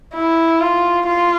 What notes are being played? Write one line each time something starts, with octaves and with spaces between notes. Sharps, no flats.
E4
F4
F4